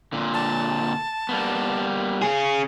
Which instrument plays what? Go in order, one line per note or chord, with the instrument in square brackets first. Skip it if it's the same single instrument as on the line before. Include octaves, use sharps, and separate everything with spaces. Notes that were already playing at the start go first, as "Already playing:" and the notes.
[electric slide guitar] A#2 D3
[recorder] A5
[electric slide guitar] G3 A#3 B3
[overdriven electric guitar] C#3 G#4